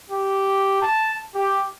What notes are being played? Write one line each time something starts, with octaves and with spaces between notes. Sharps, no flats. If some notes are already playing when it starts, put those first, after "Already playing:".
G4
A5
G4